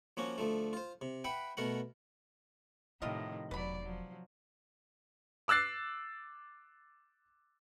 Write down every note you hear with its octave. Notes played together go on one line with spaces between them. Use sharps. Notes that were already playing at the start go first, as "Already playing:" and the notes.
F3 A#3 C#4 F#4
D2 F3 A3
F4 C5
C3
B4 E5 F#5 G5
B2 A3 A#4 F#5
A2 C3 D#3 F3 E4 F4 D#5
E1 F#3 B4 D5 B5
F3 F#3
D6 E6 F#6 A6 C7